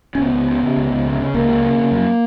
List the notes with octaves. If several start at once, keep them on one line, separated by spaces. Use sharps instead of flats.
C#4
C#2 B3
C#2
C#3
C#3
C#2
C#2
C#3
C#3
C#2 A#3
C#2
C#3
C#3
F#2